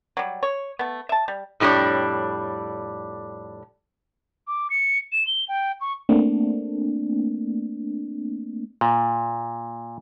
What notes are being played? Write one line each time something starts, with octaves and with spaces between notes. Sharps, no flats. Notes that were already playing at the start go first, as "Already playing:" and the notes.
F#3 G3
C#5
A3 B3
E5 A5
G3
F2 A2 G3 D4 C#5
D6
C#7
E7
G7
G5
C#6
A3 A#3 C4 D4
A#2